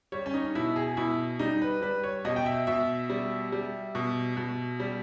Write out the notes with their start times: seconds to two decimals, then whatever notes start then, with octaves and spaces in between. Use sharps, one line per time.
0.12 G3 C#5
0.26 C#4
0.34 D#4
0.55 B2 E4
0.76 G#4
0.97 B2 E4
1.39 G3 D#4
1.62 B4
1.82 G3 B4
2.04 C#5
2.25 B2 D#5
2.36 G5
2.46 E5
2.67 B2 E5
3.10 G3
3.52 G3
3.95 B2
4.37 B2
4.80 G3